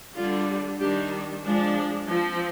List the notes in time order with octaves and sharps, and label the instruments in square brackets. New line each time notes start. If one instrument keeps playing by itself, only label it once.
[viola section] D3 G3 D4 F4
D#3 G3 D4 G4
F3 G#3 D4
F3 C4